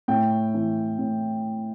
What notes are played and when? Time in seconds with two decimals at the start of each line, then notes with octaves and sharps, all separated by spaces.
0.08 A2 G5
0.54 E3
0.99 A2